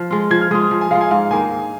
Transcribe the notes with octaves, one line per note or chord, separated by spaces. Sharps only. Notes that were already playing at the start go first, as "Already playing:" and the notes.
Already playing: F3 F6
G#3 F4
F3 G#6
F6
G#3 F4 D#6
D#6
F3
G#5
G#3 F4 F5
G#5
G#2 F5
D#3 A#3 D#4 G#5
G#2